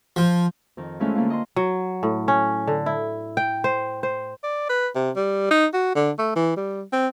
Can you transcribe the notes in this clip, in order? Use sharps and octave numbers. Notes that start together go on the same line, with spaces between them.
F3
F2 D#3
G#3 A3 C#4 E4 F4
D3 A#3 F4
D#5 C6
F#3
A2
C#4
D3
E4
G5
C5
C5
D5
B4
C3
G3
D#4
F#4
D3
A3
E3
G3
C4